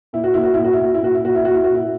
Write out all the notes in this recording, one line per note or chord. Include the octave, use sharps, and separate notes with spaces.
A#2 E4
F#4
A#2 E4
F#4
A#2 E4
F#4
E4
A#2 F#4
E4
A#2 F#4
E4
A#2 F#4
E4
A#2 F#4
E4
F#4
A#2
E4